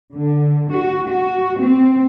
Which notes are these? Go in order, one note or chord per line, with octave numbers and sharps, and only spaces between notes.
D3
F#4
F#4
C4